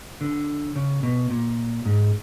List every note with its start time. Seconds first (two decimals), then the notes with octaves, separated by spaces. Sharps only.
0.21 D3
0.76 C#3
1.03 B2
1.30 A#2
1.85 G#2